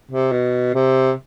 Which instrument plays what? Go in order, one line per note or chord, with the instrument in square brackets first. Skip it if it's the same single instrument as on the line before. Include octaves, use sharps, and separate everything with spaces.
[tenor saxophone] C3
B2
C3